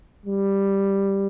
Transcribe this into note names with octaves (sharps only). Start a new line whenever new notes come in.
G3